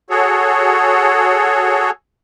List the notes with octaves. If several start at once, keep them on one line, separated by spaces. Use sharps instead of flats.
F#4 G#4 A4 C#5